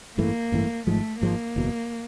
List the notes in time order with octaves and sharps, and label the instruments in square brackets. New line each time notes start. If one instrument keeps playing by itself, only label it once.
[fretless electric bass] A1 G2 E3 A3 [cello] A#3
[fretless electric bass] A1 G2 E3 A3
[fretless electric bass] G#1 G#2 F3 G#3 [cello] A3
[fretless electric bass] G#1 G#2 F3 G#3 [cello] A#3
[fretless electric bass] F#1 E2 B2